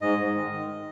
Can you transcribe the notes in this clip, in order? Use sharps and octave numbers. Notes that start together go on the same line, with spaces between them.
G#2 D#5
G#2
D#3
D#3